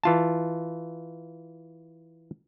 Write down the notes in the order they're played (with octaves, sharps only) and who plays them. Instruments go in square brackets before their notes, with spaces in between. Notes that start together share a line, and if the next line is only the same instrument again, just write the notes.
[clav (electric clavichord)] E3 F4 A5